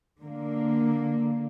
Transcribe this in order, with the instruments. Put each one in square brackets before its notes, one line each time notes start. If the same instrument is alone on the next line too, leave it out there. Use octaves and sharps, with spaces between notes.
[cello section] D3 A#3